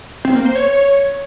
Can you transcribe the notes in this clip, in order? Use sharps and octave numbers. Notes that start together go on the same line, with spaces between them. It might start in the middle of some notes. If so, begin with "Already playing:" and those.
C4
A#3
C5
C#5